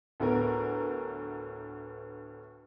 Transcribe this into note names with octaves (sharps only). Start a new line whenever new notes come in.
D2 A2 B3 A#4